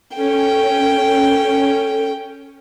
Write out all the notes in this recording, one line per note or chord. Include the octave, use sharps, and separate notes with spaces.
C#4 A4 G5